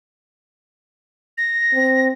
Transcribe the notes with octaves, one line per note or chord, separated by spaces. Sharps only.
A#6
C4